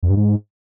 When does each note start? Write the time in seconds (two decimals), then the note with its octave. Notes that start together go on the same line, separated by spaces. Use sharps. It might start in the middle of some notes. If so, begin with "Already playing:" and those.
0.03 F2
0.10 G2
0.17 G#2